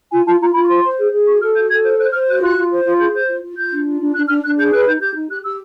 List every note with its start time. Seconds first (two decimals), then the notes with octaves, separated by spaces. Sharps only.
0.11 F4 G#5
0.26 F4 A5
0.40 F4 A#5
0.54 F4 B5
0.63 C#6
0.69 C5 C6
0.84 C5
0.98 G#4
1.12 G#4
1.27 F#4 C#6
1.41 A4 F6
1.55 F#4 G6
1.69 A4 G#6
1.84 C5 G6
1.99 C5 F#6
2.13 C5 F6
2.28 F#4 F#6
2.42 F4 F#6
2.56 F4
2.71 C5
2.84 F4
2.99 G#4 G6
3.14 C5 G6
3.29 F4
3.43 F4
3.57 F4 G6
3.71 D4
3.86 F4
4.00 D4
4.15 D4 F#6
4.28 D4 F6
4.43 D4 F#6
4.57 G#4 G6
4.72 B4 F#6
4.86 D#4 G6
5.01 G4 G6
5.15 D#4
5.30 G4 F#6
5.44 G4 E6